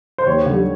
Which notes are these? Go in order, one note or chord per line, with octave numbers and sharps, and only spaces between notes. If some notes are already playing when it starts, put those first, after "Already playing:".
C5
D#2 C#5
D3
G3